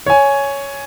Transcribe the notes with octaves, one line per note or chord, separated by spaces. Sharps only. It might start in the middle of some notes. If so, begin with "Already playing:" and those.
C#5 G#5